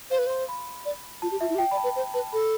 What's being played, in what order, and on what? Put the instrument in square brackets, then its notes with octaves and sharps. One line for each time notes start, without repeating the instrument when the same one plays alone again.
[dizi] C5 [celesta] F5
[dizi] B4
[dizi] C5 [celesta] C6
[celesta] B5
[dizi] D5
[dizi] F4 [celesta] A5
[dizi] G4
[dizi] F4 [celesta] E5
[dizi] E4
G4
[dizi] F4 [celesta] G5
[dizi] D5 [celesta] B5
[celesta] A5
[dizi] B4
C5
[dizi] B4 [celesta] A5
[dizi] A4 [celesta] B5